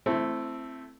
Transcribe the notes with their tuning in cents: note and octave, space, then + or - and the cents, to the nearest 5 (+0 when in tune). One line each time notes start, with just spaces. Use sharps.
A3 +0 C4 +0 E4 +30